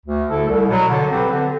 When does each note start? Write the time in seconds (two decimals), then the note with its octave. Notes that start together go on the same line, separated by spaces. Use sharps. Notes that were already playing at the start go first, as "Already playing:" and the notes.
0.06 D2
0.26 D3 A3 E4 A4
0.47 C2
0.68 B2 F#3
0.89 D3
1.10 F#3 C4 G4 B4
1.31 D3